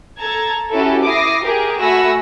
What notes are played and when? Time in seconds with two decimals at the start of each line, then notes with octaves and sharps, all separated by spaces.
0.20 A4 A5 A#5 G#6
0.72 C#4 E4 F#4 G4 A4
1.04 E4 D6 D#6 A#6 C7
1.43 G4 G#4 A#4
1.80 A3 F#4 G#5 B5 E6 A#6